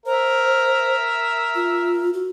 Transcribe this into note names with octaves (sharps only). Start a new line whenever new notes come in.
A#4 C5 E5
F4
F#4